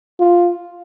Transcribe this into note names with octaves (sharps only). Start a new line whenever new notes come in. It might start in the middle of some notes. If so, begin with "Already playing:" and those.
F4